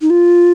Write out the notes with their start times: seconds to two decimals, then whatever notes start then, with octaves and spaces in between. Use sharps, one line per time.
0.01 D#4
0.10 F4